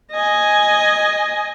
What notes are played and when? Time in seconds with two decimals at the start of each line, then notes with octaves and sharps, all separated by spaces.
0.12 D#5 G#5